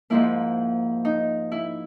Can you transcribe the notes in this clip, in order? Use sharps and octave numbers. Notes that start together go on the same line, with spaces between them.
G#2 F3 A#3 E4
D#4
E4